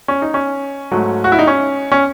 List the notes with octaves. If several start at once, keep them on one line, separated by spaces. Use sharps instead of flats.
C#4
D#4
C#4
G#2 F#3 A3
F#4
E4
D#4
C#4
C#4